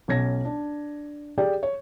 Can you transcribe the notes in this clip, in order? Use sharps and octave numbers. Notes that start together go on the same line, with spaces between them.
B1 C#4 G#6 A#6
D4
G4 G#4 D5 G5
C#5